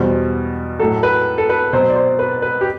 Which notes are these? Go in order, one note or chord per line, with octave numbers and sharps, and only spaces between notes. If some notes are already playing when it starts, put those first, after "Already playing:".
Already playing: E2 B2 G3 C5
A2 F#3 A4
B4
A4
B4
B2 F#3 C5
D5
C5
B4
B4
G4